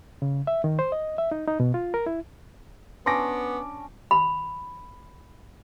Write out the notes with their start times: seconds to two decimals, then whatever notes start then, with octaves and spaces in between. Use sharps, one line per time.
0.22 C#3
0.47 E5
0.64 D#3
0.79 C5
0.92 D#5
1.18 E5
1.31 D#4
1.48 D#4
1.60 B2
1.74 F4
1.94 A#4
2.06 E4
3.06 B3 C#4 D4 C6 D6 A#6
4.11 B5